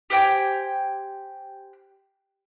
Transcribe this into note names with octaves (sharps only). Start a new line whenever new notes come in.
G4 C5 G5 G#5